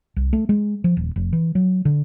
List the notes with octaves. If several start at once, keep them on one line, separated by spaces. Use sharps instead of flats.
C2
A3
G#3
F3
D#1
F1
E3
F#3
D3